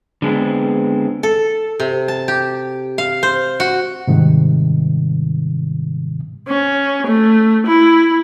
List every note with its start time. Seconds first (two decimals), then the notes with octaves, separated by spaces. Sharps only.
0.22 D3 G#3 B3 C4
1.23 A4
1.80 C3
2.08 A5
2.28 G4
2.98 F5
3.23 C5
3.60 F#4
4.07 G#2 C3 D#3 G3
6.48 C#4
7.07 A3
7.66 E4